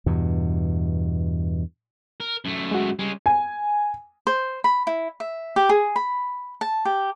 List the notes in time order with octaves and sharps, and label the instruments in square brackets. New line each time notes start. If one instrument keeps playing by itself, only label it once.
[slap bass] E2 G2 B2
[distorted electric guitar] A#4
F#2 A3
[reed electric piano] G#3 F#4
[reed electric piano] G3 [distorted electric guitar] G#3 C#4
[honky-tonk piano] G#5
[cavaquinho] C5
B5
E4
E5
G4
G#4
B5
A5
G4